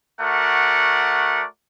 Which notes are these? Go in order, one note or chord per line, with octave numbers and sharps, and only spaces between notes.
A3 F#4 A#4 D5 F#5